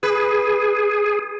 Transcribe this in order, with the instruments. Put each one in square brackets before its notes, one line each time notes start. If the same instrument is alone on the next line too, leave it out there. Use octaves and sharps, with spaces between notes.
[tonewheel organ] G#4 [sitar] B4